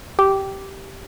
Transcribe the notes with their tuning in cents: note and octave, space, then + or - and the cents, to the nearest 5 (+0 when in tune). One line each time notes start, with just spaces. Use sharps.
G4 -10